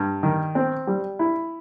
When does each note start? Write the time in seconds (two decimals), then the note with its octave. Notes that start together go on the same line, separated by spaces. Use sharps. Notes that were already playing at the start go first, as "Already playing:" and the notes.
Already playing: G2
0.23 D#3
0.55 C4
0.87 G3
1.19 E4